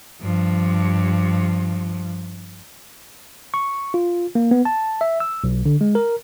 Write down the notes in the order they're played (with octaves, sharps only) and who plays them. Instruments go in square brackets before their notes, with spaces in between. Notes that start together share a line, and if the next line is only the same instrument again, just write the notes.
[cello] G2 F3
[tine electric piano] C#6
F4
A#3
B3
A5
E5
E6
B1
D3
G#3
A#4